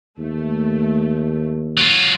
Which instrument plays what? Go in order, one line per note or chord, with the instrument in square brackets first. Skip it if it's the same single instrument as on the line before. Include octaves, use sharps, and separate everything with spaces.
[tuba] D#2 [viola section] A3
[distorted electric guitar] F#3 F4